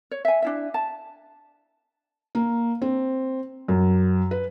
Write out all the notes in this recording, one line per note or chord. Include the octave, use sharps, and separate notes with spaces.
C#5
E5 G#5
D4 E4 E5
A5
A#3
C4
F#2
B4